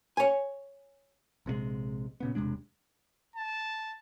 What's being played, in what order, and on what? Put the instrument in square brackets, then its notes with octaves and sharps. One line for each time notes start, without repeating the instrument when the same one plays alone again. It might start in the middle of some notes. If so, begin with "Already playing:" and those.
[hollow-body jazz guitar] C#5 G#5
[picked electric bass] A#1 C3 E3 G#3
A#2 C#3 B3
E1 C3 G#3 D4
[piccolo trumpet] A5